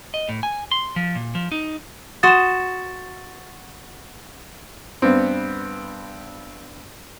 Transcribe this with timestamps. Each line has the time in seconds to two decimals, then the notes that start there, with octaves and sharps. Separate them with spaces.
0.14 D#5
0.29 A2
0.43 G#5
0.71 C6
0.96 F3
1.15 A#2
1.35 F3
1.52 D#4
2.23 F#4 C6 D#6 A6 E7
5.02 G2 B3 C4